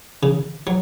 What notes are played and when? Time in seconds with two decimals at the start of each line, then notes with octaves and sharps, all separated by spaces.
0.23 C#3
0.67 F#3